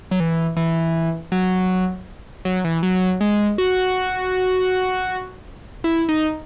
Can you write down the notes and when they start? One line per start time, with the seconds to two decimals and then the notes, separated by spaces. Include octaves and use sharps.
0.11 F#3
0.20 E3
0.56 E3
1.32 F#3
2.45 F#3
2.64 E3
2.83 F#3
3.21 G#3
3.58 F#4
5.84 E4
6.09 D#4